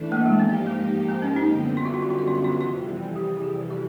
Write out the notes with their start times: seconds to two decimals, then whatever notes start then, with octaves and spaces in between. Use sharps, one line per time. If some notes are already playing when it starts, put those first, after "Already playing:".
Already playing: E3 A3 D4
0.12 A#3
0.21 G3
0.26 G#3
0.39 G#2 F3 A#3 B3 D#4 G4
0.67 C4
1.08 C4
1.22 C#4
1.36 D#4
1.50 F#2 D3 G3 B3
1.77 F4
1.85 F#4
1.94 F4
2.02 F#4
2.11 F4
2.19 F#4
2.28 F4
2.35 F#4
2.44 F4
2.52 F#4
2.60 F2 C3 E3 G3 F4
3.16 G4
3.37 G#4
3.43 G4
3.71 F#4